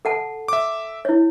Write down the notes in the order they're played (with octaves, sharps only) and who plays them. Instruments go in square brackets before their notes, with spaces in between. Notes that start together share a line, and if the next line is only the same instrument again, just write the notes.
[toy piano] A4 F#5 A5
[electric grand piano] E5 D6
[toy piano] E4 C#5